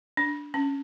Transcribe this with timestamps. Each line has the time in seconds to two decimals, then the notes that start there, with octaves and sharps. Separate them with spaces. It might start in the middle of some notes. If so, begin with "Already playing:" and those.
0.17 D4
0.54 C#4